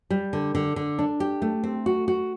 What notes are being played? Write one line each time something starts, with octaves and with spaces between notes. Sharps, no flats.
G3
D3
D3
D3
D4
G4
A3
C4
F#4
F#4